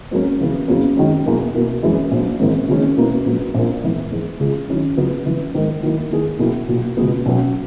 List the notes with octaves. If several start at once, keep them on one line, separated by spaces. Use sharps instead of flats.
G#2 F#3 A#3 C#4
C#3 E3 B3
F#1 E2 C#3 F#3 C#4
F#2 D#3 G#3 C#4
E2 B2 F#3 A#3 E4
B2 A#3 E4
F#2 E3 G#3
A#1 A#2 F#3
G#1 G#2 E3 A#3 C#4
F#1 F#2 D#3 G#3 C#4
B2 A#3 C#4 E4 B4
A#1 G#2 F#3
A#1 A#2 A#3
G#2 E3 B3
G#2 E3 G#3
C#2 C#3 G#3
D#3 F#3 C#4 E4
C#2 C#3 F#3 B3
C#2 C#3 E3
G#2 D#3 G#3 D#4 A#4
D#3 F#3 A#3 E4
D#3 A#3 E4 G#4
B1 B2 A#3 E4 G#4
B1 A#2 F#3
C#2 B2 G#3 B3
B1 B2 F#3 C#4 F#4